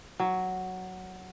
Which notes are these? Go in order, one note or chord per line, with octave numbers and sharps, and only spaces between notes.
F#3